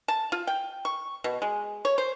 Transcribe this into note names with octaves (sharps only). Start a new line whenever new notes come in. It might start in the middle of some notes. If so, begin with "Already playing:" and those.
A5
F4
G5
C#6
B2
G#3
C#5
C5